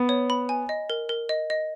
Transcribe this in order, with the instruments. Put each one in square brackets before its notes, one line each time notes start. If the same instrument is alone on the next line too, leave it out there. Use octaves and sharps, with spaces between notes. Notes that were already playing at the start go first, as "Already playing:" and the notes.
Already playing: [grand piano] B3
[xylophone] C#5
B5
G#5
D#5
A#4
A#4
D#5
D#5